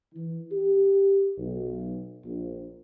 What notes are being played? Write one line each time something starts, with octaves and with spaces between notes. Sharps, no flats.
E3
G4
B1
A#1